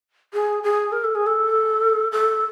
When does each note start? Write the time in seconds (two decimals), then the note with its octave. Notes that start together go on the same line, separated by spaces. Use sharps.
0.33 G#4
0.63 G#4
0.92 A#4
1.04 A4
1.15 G#4
1.27 A4
2.12 A4